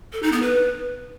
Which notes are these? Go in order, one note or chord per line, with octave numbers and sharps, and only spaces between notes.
A4
D#4
B3
B4